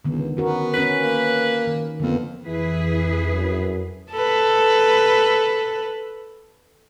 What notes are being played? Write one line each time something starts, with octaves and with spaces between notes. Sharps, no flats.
C#2 D3 D#3 B3
B3 C#4 F#4 A#4
C#4 F#4 B4
A#3
D#3
F2 D3 A#3 B3
F2 E3 E4 G#4 B4
F#2
A4 B4